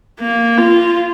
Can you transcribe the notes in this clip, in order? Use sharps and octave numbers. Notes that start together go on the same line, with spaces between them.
A#3
F4